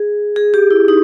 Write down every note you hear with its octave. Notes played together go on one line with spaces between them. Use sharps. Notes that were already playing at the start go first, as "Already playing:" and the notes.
Already playing: G#4
G#4
G4
E4
D#4